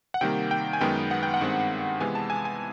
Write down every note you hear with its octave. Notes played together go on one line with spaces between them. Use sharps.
F#5
C3 D#3 G3 A#3 G5
G5
G#5
F#2 D#3 G#3 B3 G5
F#5
G5
F#5
G2 D#3 G#3 C4
C3 E3 G#3 B3 G#5
A5
G#5
G#5